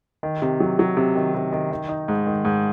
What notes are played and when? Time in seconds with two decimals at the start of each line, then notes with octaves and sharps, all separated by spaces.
0.23 D#3
0.42 C3
0.60 F#3
0.79 F#3
0.97 C3
1.16 D#3
1.34 C3
1.52 D#3
1.71 D#3
1.89 D#4
2.08 G#2
2.27 D#3
2.45 G#2